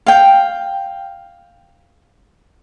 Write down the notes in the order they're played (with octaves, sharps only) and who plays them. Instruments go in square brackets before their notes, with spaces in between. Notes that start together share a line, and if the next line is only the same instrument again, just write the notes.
[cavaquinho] F5 G5